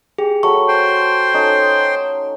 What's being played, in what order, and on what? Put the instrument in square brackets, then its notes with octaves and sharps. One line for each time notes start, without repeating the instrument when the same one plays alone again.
[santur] G4 [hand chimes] G#4
[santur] F#3 A3 B5 [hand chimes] C#6
[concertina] C5 G5 C6
[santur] C#4 D#4 A4